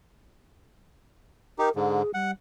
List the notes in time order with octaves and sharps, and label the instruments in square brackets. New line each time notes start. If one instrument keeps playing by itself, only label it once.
[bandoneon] D#4 G4 [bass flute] A#4
[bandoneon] G#2 D3 [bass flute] G#4
[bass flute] G3 [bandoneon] F#5